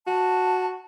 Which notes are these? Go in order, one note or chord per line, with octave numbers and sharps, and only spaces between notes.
F#4 A5